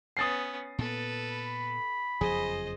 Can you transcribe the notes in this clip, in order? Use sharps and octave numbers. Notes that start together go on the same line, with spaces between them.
B3 C#4 D#6 A6 C7
A#2 B3 A4 B4
B5
F#1 F2 F3 G#4 C5 D#5